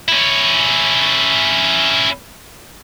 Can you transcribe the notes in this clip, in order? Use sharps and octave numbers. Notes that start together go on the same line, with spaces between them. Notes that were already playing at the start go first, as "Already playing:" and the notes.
C#4 E4